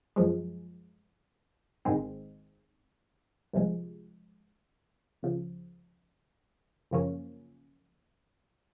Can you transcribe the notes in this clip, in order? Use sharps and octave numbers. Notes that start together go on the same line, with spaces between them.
F#2 F3 G#3
G#1 G#2 D#3 G#3 C4
C2 C3 F3 G#3
C#2 C#3 F3
F#2 C#3 F3 A#3 C#4